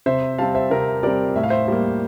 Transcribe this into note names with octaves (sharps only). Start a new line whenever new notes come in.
C3 C5 E5
G3 C4 F5 A5
C5 E5
C3 A#4
G3 C4 A#4 D5
A2 E5
F5
C5 E5
G3 A#3